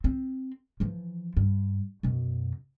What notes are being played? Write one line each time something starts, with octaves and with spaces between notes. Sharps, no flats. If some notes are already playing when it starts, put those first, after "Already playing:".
C4
E3 F3
G2
F#2 B2